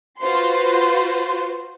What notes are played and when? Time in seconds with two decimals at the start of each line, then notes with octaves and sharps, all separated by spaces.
0.19 F4 F#4 B4 C5 C6